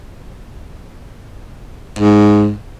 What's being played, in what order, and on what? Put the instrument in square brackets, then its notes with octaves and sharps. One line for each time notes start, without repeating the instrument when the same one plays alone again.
[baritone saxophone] G#2